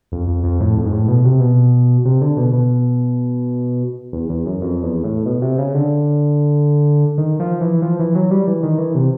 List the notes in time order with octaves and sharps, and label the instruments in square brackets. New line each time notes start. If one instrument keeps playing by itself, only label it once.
[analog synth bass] F2
F2
F2
A2
F2
G#2
A2
B2
C3
B2
C3
D3
B2
B2
E2
E2
F#2
F2
E2
A2
B2
C3
C#3
D3
D#3
F3
E3
F3
E3
F#3
G3
E3
D#3
E3
C3